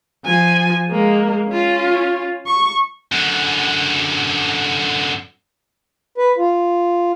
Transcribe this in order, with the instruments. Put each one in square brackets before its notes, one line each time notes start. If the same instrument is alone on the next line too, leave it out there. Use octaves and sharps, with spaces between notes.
[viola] F3 G#5
G#3 A#3
C#4 F4
C#6
[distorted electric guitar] F#2 D3
[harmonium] B4
F4